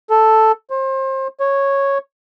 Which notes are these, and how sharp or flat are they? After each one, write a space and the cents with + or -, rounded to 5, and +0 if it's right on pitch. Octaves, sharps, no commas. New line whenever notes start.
A4 +0
C5 +30
C#5 -5